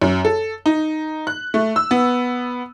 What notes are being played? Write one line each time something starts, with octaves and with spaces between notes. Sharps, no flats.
F#2
A4
D#4
F#6
A3
E6
B3